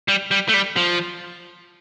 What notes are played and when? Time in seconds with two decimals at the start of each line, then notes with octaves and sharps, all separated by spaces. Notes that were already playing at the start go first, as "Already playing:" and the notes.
0.08 G3
0.31 G3
0.49 A3
0.54 G3
0.76 F3